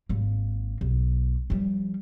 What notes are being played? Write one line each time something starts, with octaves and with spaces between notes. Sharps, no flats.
G#1 A#3
B1
F3 G3